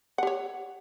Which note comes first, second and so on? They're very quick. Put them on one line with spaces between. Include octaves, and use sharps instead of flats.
F#5 G4 C#5